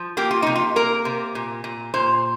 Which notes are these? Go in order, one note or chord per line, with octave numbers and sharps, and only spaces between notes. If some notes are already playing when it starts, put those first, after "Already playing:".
Already playing: F3
A#3 G4
F4
C3 D#4
F4
A#3 A#4
C3
A#2
A#2
A#2 C5